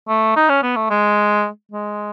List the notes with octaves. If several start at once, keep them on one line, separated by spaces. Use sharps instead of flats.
A3
D#4
C#4
B3
A3
G#3
G#3